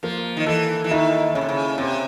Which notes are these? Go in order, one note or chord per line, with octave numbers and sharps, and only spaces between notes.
F3 A#3
D#3
E3 A4
E3
D#3 E4
C#3 C#4
C3
C#3
C3 C4